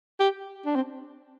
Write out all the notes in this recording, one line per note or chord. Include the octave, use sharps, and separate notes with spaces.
G4
D4
C4